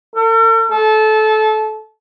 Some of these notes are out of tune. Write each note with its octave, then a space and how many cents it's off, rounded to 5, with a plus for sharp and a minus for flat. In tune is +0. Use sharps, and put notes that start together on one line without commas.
A4 +45
A4 -25